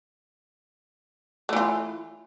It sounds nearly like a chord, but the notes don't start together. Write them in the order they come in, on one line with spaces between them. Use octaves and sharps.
A3 E3 F4